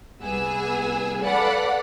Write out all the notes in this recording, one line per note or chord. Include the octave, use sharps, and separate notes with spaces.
C2 B3 G#4 G#5 E6
A4 B4 D5 F5 F#5 B5